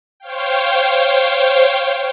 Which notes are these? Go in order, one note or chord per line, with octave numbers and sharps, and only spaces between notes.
C5 C#5 F5 G5